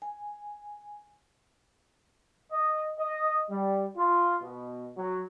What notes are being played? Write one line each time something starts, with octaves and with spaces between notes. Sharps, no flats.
G#5
D#5
D#5
G3
F4
B2
F#3